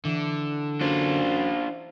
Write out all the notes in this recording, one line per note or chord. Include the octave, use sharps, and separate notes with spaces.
D3 E3
F#2 D4 F4 C5